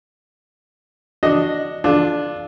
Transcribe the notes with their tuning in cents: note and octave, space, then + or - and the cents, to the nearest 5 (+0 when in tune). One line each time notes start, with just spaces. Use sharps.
D4 +0 F#4 +0 D#5 +0
D4 +0 F4 +0 A4 -40